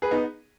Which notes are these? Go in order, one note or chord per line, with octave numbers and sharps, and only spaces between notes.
G#4 B4
B3 D#4